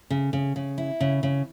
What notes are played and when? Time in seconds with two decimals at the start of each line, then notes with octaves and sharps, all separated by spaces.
0.10 C#3
0.33 C#3
0.56 C#3
0.78 E4
1.00 C#3
1.23 C#3